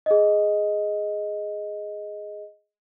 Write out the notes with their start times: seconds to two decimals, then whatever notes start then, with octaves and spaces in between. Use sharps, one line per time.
0.06 G#4 D#5